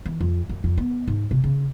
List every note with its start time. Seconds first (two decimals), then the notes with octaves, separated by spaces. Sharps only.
0.06 E3
0.21 F2
0.49 F#2
0.64 F2
0.78 B3
1.07 G#2
1.31 C3
1.44 C#3